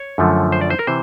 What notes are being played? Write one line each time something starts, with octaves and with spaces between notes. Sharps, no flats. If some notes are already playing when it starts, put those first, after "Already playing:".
Already playing: C#5
F#2 D3 F3 A3
C5
D5
C5
A#4
C3 E3 C5